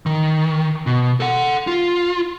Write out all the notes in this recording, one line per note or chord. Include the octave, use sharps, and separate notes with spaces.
D#3
B2
A4 F#5
F4